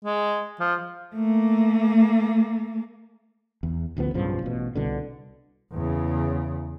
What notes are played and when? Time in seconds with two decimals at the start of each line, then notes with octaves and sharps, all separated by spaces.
0.04 G#3
0.60 F3
1.15 A3 A#3
3.63 E2
3.97 A1 D2 F3 B3
4.14 B1 G2 C#3 F3
4.43 A1 B2
4.76 C2 B2 D3
5.73 E2 C#3